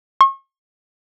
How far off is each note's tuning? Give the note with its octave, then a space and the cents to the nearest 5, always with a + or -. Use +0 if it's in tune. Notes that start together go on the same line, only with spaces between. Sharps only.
C#6 -40